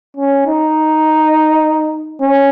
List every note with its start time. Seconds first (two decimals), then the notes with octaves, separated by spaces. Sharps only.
0.17 C#4
0.47 D#4
2.21 C#4